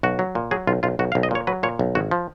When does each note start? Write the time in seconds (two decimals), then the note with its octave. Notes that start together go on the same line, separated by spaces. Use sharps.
0.03 B1 F#4
0.19 F#3
0.35 A#2
0.51 F#3 G#4
0.67 B1 F4
0.83 B1 F4
0.99 B1 F#4
1.12 F5
1.15 B1
1.23 D#5
1.31 A#2 C#5
1.47 F#3 B4
1.63 A#2 C#5
1.79 B1
1.95 G#1 F#4
2.11 F3